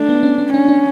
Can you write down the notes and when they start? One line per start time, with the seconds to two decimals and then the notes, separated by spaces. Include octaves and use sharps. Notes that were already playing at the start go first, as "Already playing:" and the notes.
Already playing: A3 D4
0.09 B3
0.23 C#4
0.38 C#4
0.54 C#4 D4
0.68 D4